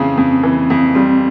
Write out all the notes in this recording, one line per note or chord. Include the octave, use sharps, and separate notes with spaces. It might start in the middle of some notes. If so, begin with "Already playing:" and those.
Already playing: F2 C#3 E3 C4
F2
E3
F2
G3 C4